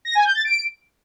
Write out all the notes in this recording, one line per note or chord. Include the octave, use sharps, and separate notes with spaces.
A#6
G#5
G6
A6
D7